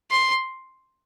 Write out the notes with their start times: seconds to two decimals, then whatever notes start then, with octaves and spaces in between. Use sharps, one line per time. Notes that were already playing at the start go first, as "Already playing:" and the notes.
0.11 C6